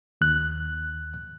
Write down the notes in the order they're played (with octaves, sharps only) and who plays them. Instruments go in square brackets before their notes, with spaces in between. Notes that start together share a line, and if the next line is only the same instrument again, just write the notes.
[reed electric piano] D#2 F#6